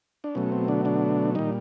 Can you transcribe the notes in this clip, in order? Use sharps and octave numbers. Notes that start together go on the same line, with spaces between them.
D4
B2 F#3 A3 C#4
C4
D3 D4
D3 D4
A#2 D#3 G3 D#4